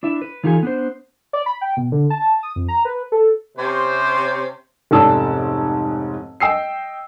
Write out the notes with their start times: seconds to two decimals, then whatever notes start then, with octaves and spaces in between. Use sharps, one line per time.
0.03 D4 E4 E5
0.22 B4
0.43 E3 D#4 F4 G4 A4 G#5
0.63 B3 D4 C5
1.33 D5
1.46 B5
1.61 G5
1.77 B2
1.92 D3
2.10 A5
2.43 D#6
2.56 F2
2.68 A#5
2.85 B4
3.12 A4
3.57 C3 C#4 C5
4.91 F1 G#2 C#4 D5 A5 E6
6.40 D#5 G5 E6 C7